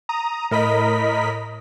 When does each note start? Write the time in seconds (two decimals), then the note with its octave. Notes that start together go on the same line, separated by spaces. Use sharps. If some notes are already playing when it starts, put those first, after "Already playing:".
0.09 A#5 D#6
0.51 A2 A#4 D#5 B5 B6